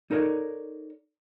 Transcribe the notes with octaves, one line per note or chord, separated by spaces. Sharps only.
D#4 A4 A#4 C#5 D5